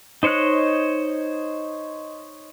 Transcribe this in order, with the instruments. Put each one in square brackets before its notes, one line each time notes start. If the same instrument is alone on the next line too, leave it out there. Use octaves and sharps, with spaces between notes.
[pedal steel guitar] D#4 C5 C#5 D#5 F#6